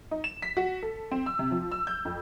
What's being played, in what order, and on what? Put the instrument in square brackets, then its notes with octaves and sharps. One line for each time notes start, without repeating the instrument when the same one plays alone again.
[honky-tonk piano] D#4
E7
B6
F#4
A4
C4
E6
C3
F3
E6
G6
F2